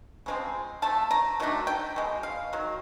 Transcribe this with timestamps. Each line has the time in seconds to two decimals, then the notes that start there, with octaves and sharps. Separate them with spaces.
0.26 C#3 F3 G#3 C4
0.82 F3 A3 A5
1.11 A#5
1.40 D#3 F#3 A3 D4
1.67 G5
1.96 B2 G#3
2.23 F5
2.53 D#3 F#3